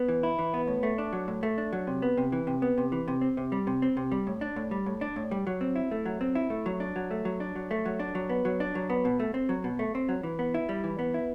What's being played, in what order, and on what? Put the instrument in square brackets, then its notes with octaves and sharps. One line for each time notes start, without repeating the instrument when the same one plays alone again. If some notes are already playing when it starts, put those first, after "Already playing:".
Already playing: [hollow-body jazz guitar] B3
E3
E4
E3
B3
A2
A3
D4
F#3
A2
A3
D4
F#3
C3
B3
C3
E3
C3
B3
C3
E3
C3
C4
C3
G3
C3
C4
C3
G3
A2
D4
A2
G3
A2
D4
A2
G3
F#3
C4
E4
A3
F#3
C4
E4
A3
F#3
D4
F#3
A3
F#3
D4
F#3
A3
F#3
D4
F#3
B3
F#3
D4
F#3
B3
B2
A3
C4
F#3
B2
A3
C4
F#3
E3
B3
E4
G3
E3
B3
E4